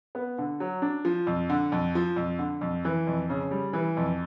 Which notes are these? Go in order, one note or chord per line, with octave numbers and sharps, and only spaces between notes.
B3
D3
F#3
D4
F3
F2
D3
F2
F3
F2
D3
F2
E3
F2
C#3
G3
E3
F2